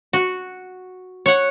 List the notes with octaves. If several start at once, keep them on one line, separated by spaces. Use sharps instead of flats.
F#4
C#5 F#5